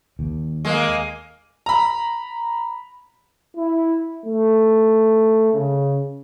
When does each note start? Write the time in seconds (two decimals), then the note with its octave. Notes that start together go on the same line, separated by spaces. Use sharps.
0.19 D#2
0.65 G#3 A#3
1.66 A#5 B5
3.57 E4
4.26 A3
5.54 C#3